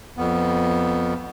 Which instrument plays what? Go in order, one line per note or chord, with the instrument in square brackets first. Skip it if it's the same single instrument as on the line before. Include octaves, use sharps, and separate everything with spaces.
[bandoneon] F2 B3